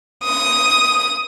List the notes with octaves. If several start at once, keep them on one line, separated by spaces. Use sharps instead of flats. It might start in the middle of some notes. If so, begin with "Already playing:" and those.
D#6